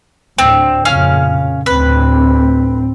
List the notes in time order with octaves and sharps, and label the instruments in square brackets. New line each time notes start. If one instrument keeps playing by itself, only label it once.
[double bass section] D2 A2 D3 [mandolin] C4
[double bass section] F2 A#2 C#3 [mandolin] C#4 F5
[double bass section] D2 A2 C4 [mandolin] B4